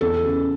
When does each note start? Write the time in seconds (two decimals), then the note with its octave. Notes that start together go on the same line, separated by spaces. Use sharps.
0.01 E2 A4
0.25 C#3